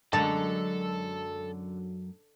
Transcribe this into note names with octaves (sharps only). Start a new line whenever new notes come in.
F#2 D3 F#3 G#3 A4 A5